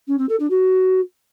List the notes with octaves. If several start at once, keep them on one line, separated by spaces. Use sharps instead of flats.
C#4
C4
A4
D4
F#4